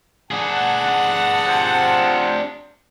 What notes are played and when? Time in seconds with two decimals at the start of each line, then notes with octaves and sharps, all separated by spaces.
0.31 D4 G#4 F#5 A5
1.46 C3 F3